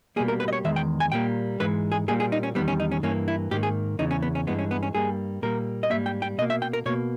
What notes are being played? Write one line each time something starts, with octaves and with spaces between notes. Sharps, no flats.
B2 G3 A#3 G#4
A#4
B4
D#5
C#5
E2 D#3 G#3 E5
G5
G#5
A#2 G3 A#3 G5
G#2 E3 G#3 B4
G#4
A#2 G3 A#3 G#4
G#4
D#4
C#4
E2 D#3 G3 B3
C#4
D#4
C#4
G2 E3 A#3 C#4
E4
G#2 D#3 A#3 G4
G#4
E2 C#3 E3 D#4
C#4
B3
C#4
G2 E3 G#3 B3
C#4
B3
C#4
G2 G3 A#3 G#4
A#2 G3 A#3 A#4
D#5
G#2 G3 A#3 E5
G5
G5
B2 A#3 D#5
E5
G5
A#4
B2 A#3 C#5